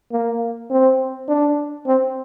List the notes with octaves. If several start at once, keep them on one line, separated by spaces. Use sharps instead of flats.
A#3
C4
D4
C4